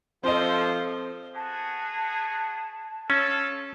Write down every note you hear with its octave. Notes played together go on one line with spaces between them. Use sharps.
F3 C4 A4 C5 D#5
B3 F#4 G#4 A5
C#4 F4 A4